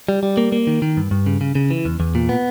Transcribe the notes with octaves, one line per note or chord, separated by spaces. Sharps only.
G3
G3
A#3
A#3
D#3
D#3
G2
G2
C#3
C#3
C#3
E3
E2
E2
A#2
B3